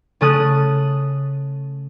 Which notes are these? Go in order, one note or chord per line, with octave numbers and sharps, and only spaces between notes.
C#3 A3 C#4 A5 D#6 F#6